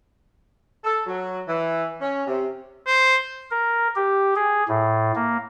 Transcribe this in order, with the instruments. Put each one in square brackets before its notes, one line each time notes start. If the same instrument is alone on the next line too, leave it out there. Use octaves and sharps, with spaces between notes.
[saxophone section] A4
F#3
E3
C#4
C3
[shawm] C5
[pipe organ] A#4
G4
G#4
A2
A#3